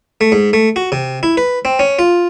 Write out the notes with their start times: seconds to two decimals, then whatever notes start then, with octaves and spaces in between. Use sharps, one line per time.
0.21 A3
0.32 G#2
0.53 A3
0.76 F#4
0.92 C3
1.23 E4
1.37 B4
1.65 C4
1.79 C#4
1.99 F4